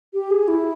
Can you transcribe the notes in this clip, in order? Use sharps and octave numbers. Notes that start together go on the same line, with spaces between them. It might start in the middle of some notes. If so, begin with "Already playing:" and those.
G4
G#4
E4